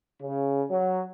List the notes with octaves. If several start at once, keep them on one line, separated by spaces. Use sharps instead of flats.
C#3
F#3